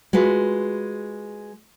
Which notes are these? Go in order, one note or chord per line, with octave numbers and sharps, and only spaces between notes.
G#3 F4 F#4 B4